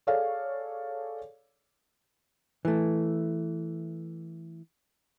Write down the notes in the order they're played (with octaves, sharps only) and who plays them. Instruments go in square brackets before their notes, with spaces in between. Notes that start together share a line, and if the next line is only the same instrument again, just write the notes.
[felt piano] G#4 A4 C#5 D5 F5
[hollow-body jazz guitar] E3 A3